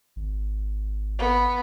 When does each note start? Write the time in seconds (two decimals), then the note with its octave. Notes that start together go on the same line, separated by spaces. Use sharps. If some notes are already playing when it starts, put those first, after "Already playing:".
0.16 G#1
1.19 B3